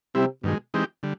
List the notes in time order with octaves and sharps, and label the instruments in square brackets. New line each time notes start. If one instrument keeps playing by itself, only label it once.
[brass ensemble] C3 [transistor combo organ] G3 C4 E4
[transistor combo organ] G2 D#3 G#3 [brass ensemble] B2
[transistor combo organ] E3 G#3 C4 D#4 G4
D3 G3